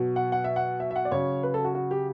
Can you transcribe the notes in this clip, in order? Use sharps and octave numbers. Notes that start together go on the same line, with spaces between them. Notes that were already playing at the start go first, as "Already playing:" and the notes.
Already playing: B2 F#3
F#5
F#5
E5
F#5
E5
E5
F#5
D5
C#3 F#3 C#5
B4
A4
F#4
F#4
G4